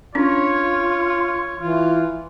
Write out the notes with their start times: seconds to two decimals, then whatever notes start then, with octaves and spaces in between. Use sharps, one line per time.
0.15 C#4 D4 F4 C#5
1.59 E3 F4